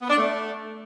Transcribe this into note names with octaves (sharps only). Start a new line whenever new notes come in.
B3
D4
A3